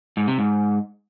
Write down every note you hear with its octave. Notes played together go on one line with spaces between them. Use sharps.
G#2
C3
G#2